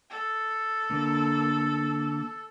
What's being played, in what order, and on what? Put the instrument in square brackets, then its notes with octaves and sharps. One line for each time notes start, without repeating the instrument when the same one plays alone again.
[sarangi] A4
[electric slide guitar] D3 A#3